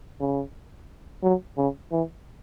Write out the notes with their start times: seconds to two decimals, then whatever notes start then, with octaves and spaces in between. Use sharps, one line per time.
0.20 C#3
1.23 F#3
1.57 C#3
1.92 E3